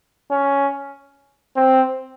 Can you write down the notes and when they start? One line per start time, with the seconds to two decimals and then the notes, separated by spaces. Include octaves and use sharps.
0.31 C#4
1.56 C4